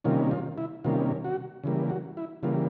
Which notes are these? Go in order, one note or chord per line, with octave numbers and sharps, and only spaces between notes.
C3 D#3 G3 A#3 C#4 F4
F4
E4
C3 D#3 G3 A#3 C#4 F4
F#4
C#3 E3 G3 A#3
F#4
E4
C#3 E3 G3 A#3 F4